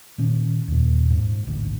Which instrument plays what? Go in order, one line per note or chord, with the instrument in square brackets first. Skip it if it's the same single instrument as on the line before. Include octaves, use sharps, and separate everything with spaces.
[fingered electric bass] A#2 D#3 C#4
D#2 A#2
G#2
A1 D2